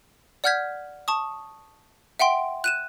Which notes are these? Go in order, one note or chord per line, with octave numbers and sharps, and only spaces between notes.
D5 F#5 F6 G6 G#6 B6
A5 C#6 D#6
E5 F#5 G5 C6 D7
F#6 D#7 E7